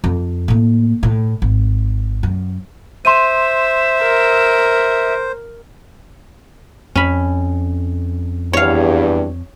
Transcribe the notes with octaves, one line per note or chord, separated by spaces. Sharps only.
F2
A2 A#3
A2
G#1
F#2
C5 E5 C6 D#7
A#4
F2 C#4 B5
E2 G2 C#5 F5